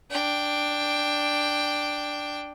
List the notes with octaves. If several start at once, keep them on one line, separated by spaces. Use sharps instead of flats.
D4 G5